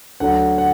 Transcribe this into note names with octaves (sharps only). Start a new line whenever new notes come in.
D2 D3 F#3 F#5
F#5